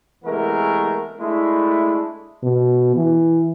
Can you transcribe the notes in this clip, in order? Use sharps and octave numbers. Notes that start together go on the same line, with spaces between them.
C3 E3 G#3 A3 B3 A#4
G#3 A3 D4 E4
B2
E3